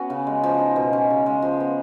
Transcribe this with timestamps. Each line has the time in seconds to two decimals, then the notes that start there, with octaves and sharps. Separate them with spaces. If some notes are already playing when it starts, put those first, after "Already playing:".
Already playing: B3 C#4 F#4
0.10 C#3
0.27 G#3
0.43 F3
0.60 D#4
0.76 B2
0.93 C#4
1.10 C#3
1.26 G#3
1.42 F3
1.60 B3